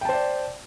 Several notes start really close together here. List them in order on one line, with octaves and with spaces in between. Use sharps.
G5 A5 C5 D5